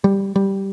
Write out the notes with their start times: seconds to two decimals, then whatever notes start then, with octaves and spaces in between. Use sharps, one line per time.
0.04 G3
0.36 G3